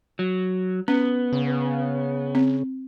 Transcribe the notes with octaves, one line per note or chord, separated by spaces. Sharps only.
F#3
B3 C#4
C#3
C4